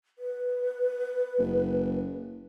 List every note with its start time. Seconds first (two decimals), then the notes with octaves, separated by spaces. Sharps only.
0.19 B4
1.38 F#1